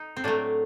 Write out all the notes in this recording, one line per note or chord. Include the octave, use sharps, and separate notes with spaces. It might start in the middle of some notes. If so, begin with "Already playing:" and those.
Already playing: D#4
C4
A2 F#3 A3 D4